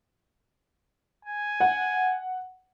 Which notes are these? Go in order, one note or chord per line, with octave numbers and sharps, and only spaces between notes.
G#5
F#5